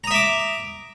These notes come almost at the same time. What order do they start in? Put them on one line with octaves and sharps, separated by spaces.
A#5 D#6 E5 D6